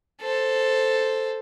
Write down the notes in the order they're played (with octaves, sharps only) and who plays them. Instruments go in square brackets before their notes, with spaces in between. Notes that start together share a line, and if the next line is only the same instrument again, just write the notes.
[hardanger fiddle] A4 C5